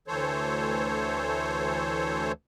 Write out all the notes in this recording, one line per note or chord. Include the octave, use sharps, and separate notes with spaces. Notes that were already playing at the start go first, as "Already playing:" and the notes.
D2 E3 A4 C5 C#5